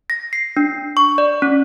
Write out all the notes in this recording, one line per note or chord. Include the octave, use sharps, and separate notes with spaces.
A#6
C7
D4
C#6
D5
C#4